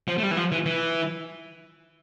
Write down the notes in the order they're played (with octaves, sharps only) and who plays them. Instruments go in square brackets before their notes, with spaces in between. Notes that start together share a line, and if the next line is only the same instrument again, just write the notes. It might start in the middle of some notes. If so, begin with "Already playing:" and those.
[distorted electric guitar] F3
A3
G3
E3
F3
E3
E3